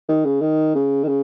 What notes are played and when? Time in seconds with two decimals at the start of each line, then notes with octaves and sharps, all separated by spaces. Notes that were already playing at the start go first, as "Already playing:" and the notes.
0.09 D#3
0.25 C#3
0.41 D#3
0.75 C#3
1.04 D#3
1.08 C#3